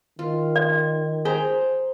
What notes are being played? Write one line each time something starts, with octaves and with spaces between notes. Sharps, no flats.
D#3 F4
D5
G#4 C5 G5 A#5